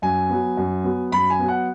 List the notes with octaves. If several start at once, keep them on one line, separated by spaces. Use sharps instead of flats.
F#2 G#5
F#3 B3
F#2
F#3 B3
F#2 B5
G#5
F#3 B3
F#5